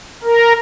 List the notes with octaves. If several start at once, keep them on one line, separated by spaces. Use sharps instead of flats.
A#4